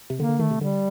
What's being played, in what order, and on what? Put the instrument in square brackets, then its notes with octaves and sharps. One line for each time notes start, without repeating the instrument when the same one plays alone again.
[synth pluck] C3
[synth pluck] D3 [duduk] A#3
[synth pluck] D3
[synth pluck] D#3 [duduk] A3
[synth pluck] C3
[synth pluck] D3 [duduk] G3